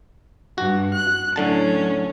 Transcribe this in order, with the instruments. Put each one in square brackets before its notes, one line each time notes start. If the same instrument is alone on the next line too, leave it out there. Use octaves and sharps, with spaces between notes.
[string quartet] G2 [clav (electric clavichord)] F#4
[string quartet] F#6
[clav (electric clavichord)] A2 D3 A5 [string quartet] F#3 C#4